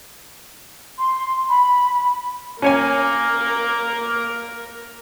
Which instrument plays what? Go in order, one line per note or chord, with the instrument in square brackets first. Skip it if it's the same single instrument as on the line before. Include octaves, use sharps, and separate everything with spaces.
[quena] C6
B5
[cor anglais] A#3 [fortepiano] C#4 C#5 G#5 [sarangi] A#4